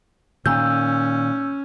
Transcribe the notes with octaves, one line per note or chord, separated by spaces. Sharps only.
A#2 D#3 C#4 E6 G6